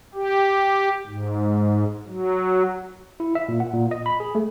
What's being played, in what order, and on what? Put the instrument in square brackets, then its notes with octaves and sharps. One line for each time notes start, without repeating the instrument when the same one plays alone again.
[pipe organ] G4
G#2
F#3
[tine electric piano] E4
E5
A#2
F#5
A#2
D#5
B5
G#4
A3